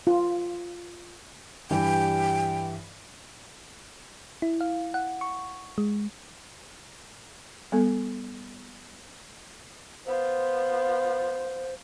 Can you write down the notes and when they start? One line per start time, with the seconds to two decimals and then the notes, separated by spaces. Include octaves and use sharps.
0.07 F4
1.71 G2 E3 G3 G5
4.42 E4
4.61 F5
4.94 F#5
5.21 C#6
5.78 G#3
7.72 G3 B3 A4
10.06 B3 F4 C5